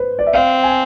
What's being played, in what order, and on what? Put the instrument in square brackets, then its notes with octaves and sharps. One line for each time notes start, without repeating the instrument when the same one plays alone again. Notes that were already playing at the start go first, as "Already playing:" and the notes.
Already playing: [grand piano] B4 C5
D5
E5
[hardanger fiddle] C4 [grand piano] F5
[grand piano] G#5